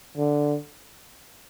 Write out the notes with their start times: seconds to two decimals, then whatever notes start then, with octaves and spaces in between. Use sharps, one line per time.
0.17 D3